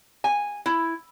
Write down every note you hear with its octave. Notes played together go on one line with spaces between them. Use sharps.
G#5
E4